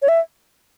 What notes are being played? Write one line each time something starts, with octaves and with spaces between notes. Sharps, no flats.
C#5
E5